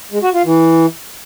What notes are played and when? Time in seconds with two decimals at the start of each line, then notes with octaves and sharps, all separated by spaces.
0.12 G#3
0.23 F#4
0.34 F4
0.44 E3